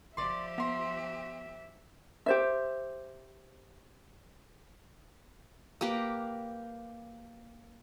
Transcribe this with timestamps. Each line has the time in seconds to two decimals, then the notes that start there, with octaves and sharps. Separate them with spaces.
0.17 G1 F3 G4 D5 E5 C6
0.58 B3 A#5 C6
2.26 G4 C5 E5
5.81 A#3 G4 B4